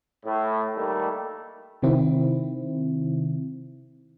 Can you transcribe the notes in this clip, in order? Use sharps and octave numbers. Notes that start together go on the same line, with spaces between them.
A2
D#3 G3 A3 A#3
C3 D#3 C4 E4